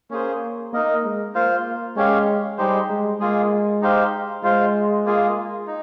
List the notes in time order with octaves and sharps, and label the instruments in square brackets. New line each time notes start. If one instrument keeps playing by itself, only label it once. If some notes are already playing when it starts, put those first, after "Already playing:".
[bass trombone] A#3 [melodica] C#4 G#4 C5
[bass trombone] A#3 [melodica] D#4 A#4 D#5
[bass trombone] G#3
[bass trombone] A#3 [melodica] F4 C5 F5
[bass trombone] G#3 [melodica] C#4 G4 C#5 F5
[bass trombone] G3 [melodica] G#3 D#4 G4 C5
[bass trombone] G#3
[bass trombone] G#3 [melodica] A#3 F4 G#4
[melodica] D#4 G4 C5 F5
[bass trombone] G#3 [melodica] F4 C5 F5
[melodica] A#3 F4 G#4
D#4